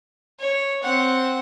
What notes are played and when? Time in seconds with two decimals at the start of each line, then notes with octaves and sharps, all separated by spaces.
0.40 C#5
0.84 C4 F#5